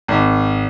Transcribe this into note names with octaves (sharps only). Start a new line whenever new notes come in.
G#1